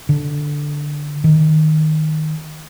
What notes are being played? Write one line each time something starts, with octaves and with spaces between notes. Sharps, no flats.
D3
D#3